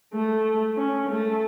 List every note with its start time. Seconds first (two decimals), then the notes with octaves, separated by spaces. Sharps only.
0.13 A3
0.77 C#4
1.09 A3